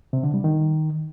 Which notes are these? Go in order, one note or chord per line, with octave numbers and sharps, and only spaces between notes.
C3
D3
G3
D#3